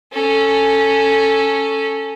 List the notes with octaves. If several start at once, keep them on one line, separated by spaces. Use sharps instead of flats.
C#4 A4